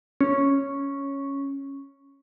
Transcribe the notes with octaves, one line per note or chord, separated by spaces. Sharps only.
C#4